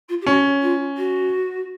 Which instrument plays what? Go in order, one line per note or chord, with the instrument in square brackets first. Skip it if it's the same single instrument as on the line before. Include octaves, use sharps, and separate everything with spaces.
[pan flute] F4
G4
[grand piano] C#4 [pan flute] F#4
[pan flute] F4
F#4